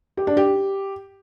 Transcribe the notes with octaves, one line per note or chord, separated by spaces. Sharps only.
G4
D4
G4